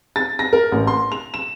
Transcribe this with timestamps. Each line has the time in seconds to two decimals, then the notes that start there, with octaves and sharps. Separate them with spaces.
0.16 A6
0.39 A#6
0.53 A#4
0.72 A1
0.87 C6
1.12 F7
1.34 E7